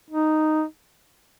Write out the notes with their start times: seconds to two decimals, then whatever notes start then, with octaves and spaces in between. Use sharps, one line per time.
0.10 D#4